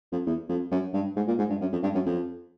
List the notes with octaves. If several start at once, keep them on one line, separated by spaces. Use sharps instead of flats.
F2
E2
F2
F#2
G2
G#2
A#2
G#2
G2
F#2
F2
G2
F#2
F2